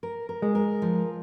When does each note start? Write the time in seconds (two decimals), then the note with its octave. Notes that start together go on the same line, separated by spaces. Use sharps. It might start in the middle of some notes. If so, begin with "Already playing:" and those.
0.03 A#4
0.29 A#4
0.42 G#3
0.55 A#4
0.82 F3